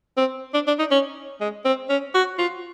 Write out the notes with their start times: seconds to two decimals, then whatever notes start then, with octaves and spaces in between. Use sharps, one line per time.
0.17 C4
0.54 D4
0.67 D4
0.79 D#4
0.91 C#4
1.40 G#3
1.65 C4
1.89 C#4
2.15 F#4
2.38 F4